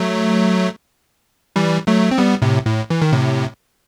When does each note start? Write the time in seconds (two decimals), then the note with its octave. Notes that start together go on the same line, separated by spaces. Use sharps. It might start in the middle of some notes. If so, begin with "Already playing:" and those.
Already playing: F#3 A3
1.56 E3 G3
1.87 F#3 A3
2.11 C4
2.18 G3 B3
2.42 A2 C3
2.65 A2
2.90 E3
3.02 D#3
3.13 A2 C3